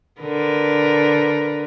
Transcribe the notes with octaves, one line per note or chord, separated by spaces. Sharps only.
D3 A#4 B4